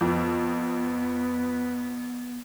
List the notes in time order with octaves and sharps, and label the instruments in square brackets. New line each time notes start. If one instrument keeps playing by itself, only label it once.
[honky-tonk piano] F2 [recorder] B3